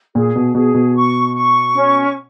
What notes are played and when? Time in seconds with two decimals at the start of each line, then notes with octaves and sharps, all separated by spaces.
0.15 A#2 G#4
0.36 B2
0.55 B2 G#4
0.74 B2
0.96 C#6
1.35 C#6
1.75 C#4